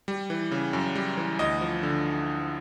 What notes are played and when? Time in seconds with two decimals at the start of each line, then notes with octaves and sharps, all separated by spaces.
0.08 G3
0.30 E3
0.51 C#3
0.73 F#2
0.95 G3
1.17 E3
1.39 D2 D#5
1.61 F3
1.83 D3